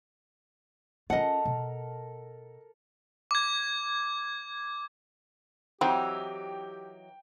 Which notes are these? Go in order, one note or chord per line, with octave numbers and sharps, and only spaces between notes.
C#4 F4 A4 A#4 D#5 F#5
B2
D6 G#6
E3 F#3 C4 D#4 F#4 G4 G5